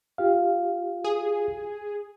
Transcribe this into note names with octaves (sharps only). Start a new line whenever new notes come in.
F4 G4 F5
G#4